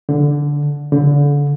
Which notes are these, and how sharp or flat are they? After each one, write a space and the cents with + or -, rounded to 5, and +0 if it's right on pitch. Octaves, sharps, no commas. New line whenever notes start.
D3 -10
D3 -30